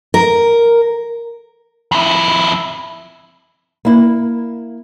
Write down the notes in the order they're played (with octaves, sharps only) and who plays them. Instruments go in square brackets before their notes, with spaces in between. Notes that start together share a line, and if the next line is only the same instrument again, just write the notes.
[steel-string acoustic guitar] A#4
[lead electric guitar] F2 E4
[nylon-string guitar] A#3 E4